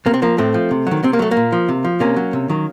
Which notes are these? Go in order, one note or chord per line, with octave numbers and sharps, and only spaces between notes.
C3 A#3
C4
F3 A#3
A2 A3 C4
F3
C3
D#3 F#3
C3 C4
A#3
F#3 A3
A#3
A#2
F3
C3
F3
C3 A#3 C#4
F#3
C3
D#3 F#3